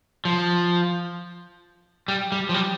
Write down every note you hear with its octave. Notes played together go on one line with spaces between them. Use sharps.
F3
G3
G3
F3
G3